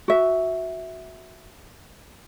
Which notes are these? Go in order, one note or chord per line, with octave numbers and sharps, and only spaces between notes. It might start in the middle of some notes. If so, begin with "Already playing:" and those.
F#4 E5